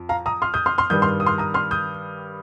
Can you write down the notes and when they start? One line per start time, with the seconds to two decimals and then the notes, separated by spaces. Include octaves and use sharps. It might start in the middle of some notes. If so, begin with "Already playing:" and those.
Already playing: F2
0.09 F5 A#5
0.26 A#5 D#6
0.42 C6 F6
0.54 D#6 G6
0.66 C6 F6
0.78 C6 F6
0.90 G2 D#3 G3 D#6 G6
1.02 C6 F6
1.20 D#6
1.26 C6 F6
1.38 A#5 D#6
1.54 C6 F6
1.71 D#6 G6